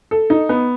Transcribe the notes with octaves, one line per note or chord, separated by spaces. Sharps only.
A4
D#4
B3